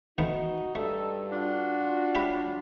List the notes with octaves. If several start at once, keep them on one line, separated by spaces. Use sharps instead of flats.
D#3 A3 B3 D#4 F#4
G2 A3 A4
D4 F4 F#4
F#3 G4 E5 B5